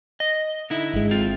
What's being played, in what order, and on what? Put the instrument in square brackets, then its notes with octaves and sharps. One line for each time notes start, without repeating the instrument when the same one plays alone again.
[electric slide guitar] D#5
D3 D#4 E4
[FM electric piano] G#1 G#3
[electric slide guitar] C4 F4